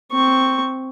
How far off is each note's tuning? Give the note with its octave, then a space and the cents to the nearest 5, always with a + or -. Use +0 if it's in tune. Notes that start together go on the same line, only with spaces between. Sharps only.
C4 +0 C#6 +0